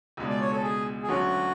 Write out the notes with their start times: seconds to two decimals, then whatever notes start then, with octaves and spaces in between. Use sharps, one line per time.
0.17 C#2 B2 G#3 D4
0.30 D5
0.41 C#5
0.52 A4
0.63 G#4
1.03 G#4
1.08 D2 D3 F#3 C#4 F#4